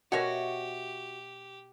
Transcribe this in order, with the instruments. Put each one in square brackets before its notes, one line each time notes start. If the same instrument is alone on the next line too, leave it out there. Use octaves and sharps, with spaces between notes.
[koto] B2 C#5 [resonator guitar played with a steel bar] F#4 [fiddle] G4 [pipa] A#4 E5 F#5